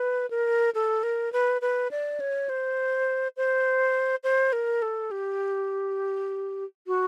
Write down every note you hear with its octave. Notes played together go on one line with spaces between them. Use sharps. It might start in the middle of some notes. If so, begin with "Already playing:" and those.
Already playing: B4
A#4
A4
A#4
B4
B4
D5
C#5
C5
C5
C5
A#4
A4
G4
F#4